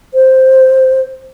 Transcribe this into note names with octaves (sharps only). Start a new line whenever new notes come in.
C5